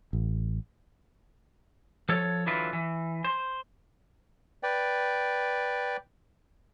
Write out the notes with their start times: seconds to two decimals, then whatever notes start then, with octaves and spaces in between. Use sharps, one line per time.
0.13 A1
2.09 F3 A4 C#5
2.46 D3 E3 F#3 E4 F4 B4
2.73 E3
3.24 C5
4.63 B4 D5 G5